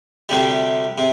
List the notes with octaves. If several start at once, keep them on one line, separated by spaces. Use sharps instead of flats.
D2 C3 G3
C3